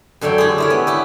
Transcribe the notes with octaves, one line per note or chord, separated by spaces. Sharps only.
F#2 D3 D4 C#5 G5
G4 G#4
E4 A#4 C#5
B3
E4 G4